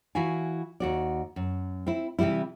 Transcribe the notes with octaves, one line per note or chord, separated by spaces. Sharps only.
E3 E4 F#4 F5 G#5
D#2 F#4 D5
F#2
C4 E4
C3 E3 F#3 G3 E4